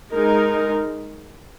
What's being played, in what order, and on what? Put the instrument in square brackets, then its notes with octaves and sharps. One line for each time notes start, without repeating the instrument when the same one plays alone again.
[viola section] G#3 D#4 A#4